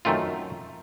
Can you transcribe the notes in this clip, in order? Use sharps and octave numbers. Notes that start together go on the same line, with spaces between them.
F#2 D#3 A3 C4 F4